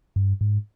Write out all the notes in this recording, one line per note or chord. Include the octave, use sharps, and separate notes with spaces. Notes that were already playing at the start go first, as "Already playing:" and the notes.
G2
G#2